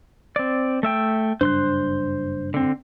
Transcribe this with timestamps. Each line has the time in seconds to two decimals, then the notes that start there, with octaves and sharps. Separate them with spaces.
0.36 C4 D5
0.83 A3 E5 G5
1.41 F#1 G2 D4 C5 C6 F#6
2.54 D3 C4